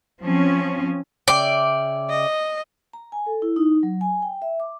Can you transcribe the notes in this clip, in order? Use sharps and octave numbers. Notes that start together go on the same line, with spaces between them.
F3 C4 C#4
C#3 D5 E5 G5
D#5
A#5
G#5
A4
E4
D#4
F#3
G#5
G5
E5
D6